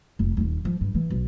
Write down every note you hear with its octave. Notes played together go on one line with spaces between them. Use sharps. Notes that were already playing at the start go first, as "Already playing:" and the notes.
F1
D#1 D#2
F3
G2
E3
B1